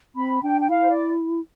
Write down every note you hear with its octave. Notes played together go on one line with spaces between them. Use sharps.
C4 B5
D4 G5
G5
E4 F5
C5
D5